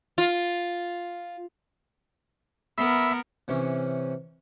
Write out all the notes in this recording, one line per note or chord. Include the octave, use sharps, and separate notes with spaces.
F4
B3 A#4 E5 B5
C3 E3 C#4